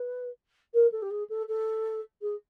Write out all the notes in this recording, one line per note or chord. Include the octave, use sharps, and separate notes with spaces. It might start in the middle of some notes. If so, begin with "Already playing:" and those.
Already playing: B4
A#4
A4
G4
G#4
A4
A4
G#4